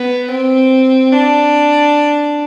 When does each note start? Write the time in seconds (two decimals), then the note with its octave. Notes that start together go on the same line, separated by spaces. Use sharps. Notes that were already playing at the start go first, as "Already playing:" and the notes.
Already playing: B3
0.31 C4
1.12 D4